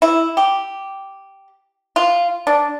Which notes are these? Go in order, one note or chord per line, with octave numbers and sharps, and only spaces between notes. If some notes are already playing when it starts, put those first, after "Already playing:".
E4
G4
F4
D4